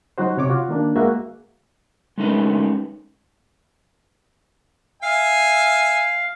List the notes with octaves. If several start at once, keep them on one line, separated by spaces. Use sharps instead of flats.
F#3 D#4 F#4 C5
C3 C#5 D6
F4 F#4
D#3 A#3 D4
G#3 A#3 F#4 G#4 E5
G#3 A3 C#4 D#4 A#4 B4
E5 F5 G#5